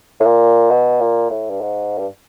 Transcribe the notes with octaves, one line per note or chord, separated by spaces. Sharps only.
A2
A#2
B2
A#2
A2
G2
G#2
G2